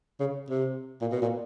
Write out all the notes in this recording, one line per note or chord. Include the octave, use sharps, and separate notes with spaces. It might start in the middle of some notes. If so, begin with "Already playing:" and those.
C#3
C3
A#2
B2
A#2